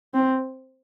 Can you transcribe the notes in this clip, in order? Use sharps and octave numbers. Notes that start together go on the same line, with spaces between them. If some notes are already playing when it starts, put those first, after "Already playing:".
C4